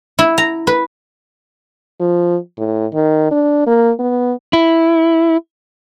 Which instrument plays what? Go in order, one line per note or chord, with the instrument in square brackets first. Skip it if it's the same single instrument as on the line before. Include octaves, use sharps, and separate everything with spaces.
[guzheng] E4
A#5
B4
[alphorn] F3
A2
D#3
D4
A#3
B3
[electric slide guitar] E4